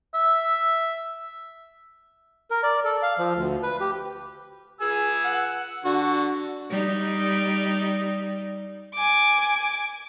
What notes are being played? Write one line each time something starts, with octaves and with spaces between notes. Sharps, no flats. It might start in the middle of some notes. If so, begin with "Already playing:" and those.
E5
A#4
D5
A4
F5
F3
D2
B4
G4
G#4 G#5 E6
F#5
D3 F#4
G3 D#4
G#5 D6